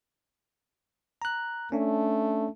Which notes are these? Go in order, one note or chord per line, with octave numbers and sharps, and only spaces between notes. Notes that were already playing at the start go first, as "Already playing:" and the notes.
A#5 F#6
A3 C#4 D4